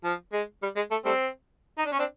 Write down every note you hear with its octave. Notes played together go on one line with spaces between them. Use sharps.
F3
G#3
G3
G#3
A3
G3 A3 C4
D#4
D4
C#4
C4 D4